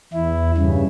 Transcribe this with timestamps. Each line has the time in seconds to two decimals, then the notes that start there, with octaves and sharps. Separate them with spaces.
0.14 E2 E4
0.57 G2 C#3